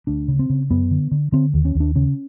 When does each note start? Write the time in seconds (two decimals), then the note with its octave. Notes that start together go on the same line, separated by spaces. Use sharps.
0.07 D2 D4
0.28 C#3
0.39 C4
0.50 C#3
0.70 F#2 B3
0.91 D3
1.11 D3
1.32 D3 C4
1.54 D#2
1.65 C#4
1.75 D#2
1.80 D4
1.95 C#3 C#4